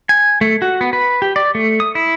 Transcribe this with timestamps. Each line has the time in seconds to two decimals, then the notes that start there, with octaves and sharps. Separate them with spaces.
0.09 G#5
0.41 A3
0.62 F#4
0.81 B3
0.93 B4
1.22 G4
1.36 D5
1.55 A3
1.80 D#6
1.95 E4